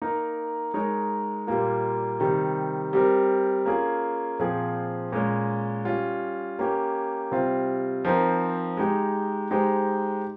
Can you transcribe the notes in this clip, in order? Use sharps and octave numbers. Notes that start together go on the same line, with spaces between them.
A#3 D#4 A#4
G#3 D#4 A#4 C#5
A#2 G3 A#3 F4
C3 D#3 G3
G3 C4 G4 A#4
A#3 C#4 F4 G#4
A#2 F3 C4 F4 G#4
A#2 G#3 C#4
G3 C#4 F4
A#3 C#4 G4 C#5
C3 G3 C4 F4 C5
F3 C4 D#4 A#4
G#3 D#4 G4
G#3 D#4 G4 C5